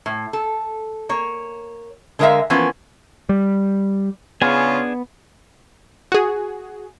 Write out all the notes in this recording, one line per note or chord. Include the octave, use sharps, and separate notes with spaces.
A2
A4
A#3 C#5
D3 G#3 A#4 C#5 E5 F5
E3 F3 A#3 B3 C#4
G3
C#3 B3 C#4 D4 F4 G#4 G#5
F#4 G#4